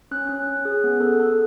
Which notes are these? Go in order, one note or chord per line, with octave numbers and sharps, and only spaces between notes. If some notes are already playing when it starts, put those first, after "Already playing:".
C#4 F#6
C#4 F#6
C#4
G#4
B3
A4
A4